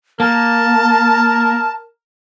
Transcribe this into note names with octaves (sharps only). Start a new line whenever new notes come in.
A#3 A#4 A5